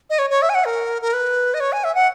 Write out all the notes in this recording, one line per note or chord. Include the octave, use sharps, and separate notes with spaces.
D#5
C#5
C#5
E5
G#5
F#5
A#4
A#4
B4
D#5
C#5
G#5
E5
F#5